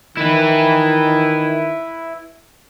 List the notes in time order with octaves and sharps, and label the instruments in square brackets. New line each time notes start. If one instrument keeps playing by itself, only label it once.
[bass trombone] D#3 [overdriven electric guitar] E4 B4